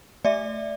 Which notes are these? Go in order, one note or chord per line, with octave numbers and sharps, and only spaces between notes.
A3 D5 E5